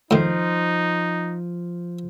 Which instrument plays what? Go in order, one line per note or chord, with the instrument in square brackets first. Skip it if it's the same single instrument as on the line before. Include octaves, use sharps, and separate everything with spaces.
[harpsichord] A2 D#3 [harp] F3 C5 [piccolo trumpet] D#4